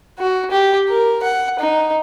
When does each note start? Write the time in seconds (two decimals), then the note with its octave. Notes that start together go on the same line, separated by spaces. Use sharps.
0.18 F#4
0.50 G4
0.89 A#4
1.23 F#5
1.59 D#4